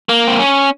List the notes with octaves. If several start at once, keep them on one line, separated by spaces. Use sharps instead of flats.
A#3
C4
C#4